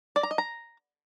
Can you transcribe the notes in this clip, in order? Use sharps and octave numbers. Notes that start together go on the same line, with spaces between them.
D5
A#5
D#5
A#5